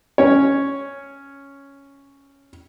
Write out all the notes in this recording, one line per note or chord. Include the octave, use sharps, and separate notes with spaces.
C#4 C#5